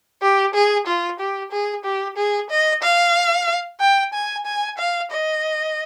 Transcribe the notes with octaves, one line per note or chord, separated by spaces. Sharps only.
G4
G#4
F4
G4
G#4
G4
G#4
D#5
F5
G5
G#5
G#5
F5
D#5